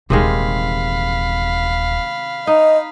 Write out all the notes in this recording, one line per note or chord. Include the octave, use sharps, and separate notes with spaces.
D#1 C3 D#3 E3 G#3 F5 B5
D#4 D#5